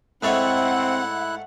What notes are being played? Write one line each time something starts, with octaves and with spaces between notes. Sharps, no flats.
G#2 A3 C4 E4 C#5 F#5 F#6